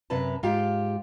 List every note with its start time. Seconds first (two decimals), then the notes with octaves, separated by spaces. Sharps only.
0.10 F#2 C3 C#4 B4 A5
0.43 G#2 F4 G4